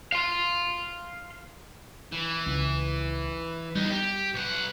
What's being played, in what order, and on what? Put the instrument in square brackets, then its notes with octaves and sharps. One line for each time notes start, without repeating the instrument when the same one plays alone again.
[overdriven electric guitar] F5 C6
[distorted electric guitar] E3
[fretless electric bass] C#2
[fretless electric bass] G3 [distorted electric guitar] B3 D#4
[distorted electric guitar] G4
B1 F#5